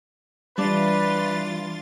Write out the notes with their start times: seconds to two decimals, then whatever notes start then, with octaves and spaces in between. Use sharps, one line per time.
0.58 E3 G3 D4 F4 B4 A6